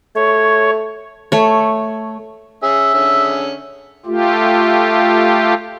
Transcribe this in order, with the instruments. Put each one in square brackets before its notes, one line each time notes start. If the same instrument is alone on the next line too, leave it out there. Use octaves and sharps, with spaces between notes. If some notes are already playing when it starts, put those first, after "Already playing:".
[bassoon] A3 [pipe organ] C#5
[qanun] A3 C#5
[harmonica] C#4 G#4 [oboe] E5
[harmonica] D3 C#4 G#4
[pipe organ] A3 F4 G4